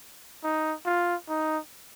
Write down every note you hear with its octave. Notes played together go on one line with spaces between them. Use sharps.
D#4
F4
D#4